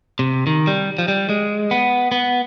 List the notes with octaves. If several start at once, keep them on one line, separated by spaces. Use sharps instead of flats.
C3
D#3
G3
F3
G3
G#3
B3
B3